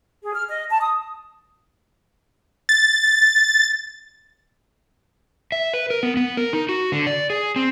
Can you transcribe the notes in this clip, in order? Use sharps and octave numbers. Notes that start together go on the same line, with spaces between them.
G#4
F6
D#5
A5
D#6
A6
E5
B4
A#4
B3
B3
A#4
D#4
F#4
D3
D5
G#4
C4